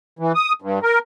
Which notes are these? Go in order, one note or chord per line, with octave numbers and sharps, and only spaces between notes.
E3
D#6
G2
A#4